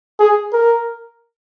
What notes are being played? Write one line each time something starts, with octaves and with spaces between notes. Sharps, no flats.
G#4
A#4